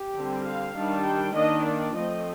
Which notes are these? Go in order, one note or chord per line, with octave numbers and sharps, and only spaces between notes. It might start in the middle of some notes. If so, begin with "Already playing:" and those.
Already playing: G4
D3 G3 C4
F5
D#3 G3 D4
G5
D#3 A#3 D4 D#5
D5
F3 A3 C4 D#5